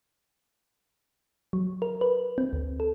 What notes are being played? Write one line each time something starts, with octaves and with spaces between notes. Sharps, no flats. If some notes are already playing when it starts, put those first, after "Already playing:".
F#3
A#4
B4
C4
D2
A4